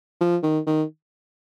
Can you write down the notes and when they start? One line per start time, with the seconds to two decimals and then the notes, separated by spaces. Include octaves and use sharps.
0.21 F3
0.43 D#3
0.67 D#3